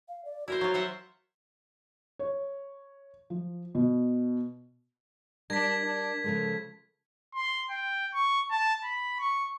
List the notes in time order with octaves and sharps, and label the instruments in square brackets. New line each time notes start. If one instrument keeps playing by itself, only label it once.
[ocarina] F5
D5
[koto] E4 A#4 C5 [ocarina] F#4
[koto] F#3 F4
C5 E5 F#5
[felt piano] C#5
F3
B2
[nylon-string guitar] G3 [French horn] D4 [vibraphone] A#4 [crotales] G#6 B6
[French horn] D4
[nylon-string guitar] C#3 F3 G#3 [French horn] A4
[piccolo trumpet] C6
G5
C#6
A5
B5
C#6